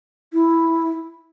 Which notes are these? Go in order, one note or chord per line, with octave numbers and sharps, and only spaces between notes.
E4